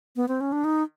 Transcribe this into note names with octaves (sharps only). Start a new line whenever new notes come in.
B3
C4
C#4
D4
D#4